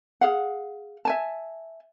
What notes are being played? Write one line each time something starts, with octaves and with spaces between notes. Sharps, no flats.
G#4 F5 F#5
E5 G#5 A5